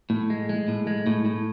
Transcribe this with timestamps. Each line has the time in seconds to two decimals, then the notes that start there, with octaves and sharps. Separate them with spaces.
0.10 A2
0.30 G#3
0.49 G#3
0.68 A2
0.87 G#3
1.07 A2
1.26 A2